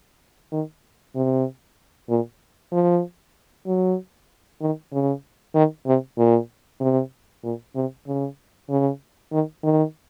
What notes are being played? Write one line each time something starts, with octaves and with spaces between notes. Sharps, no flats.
D#3
C3
A#2
F3
F#3
D#3
C#3
D#3
C3
A#2
C3
A#2
C3
C#3
C#3
D#3
D#3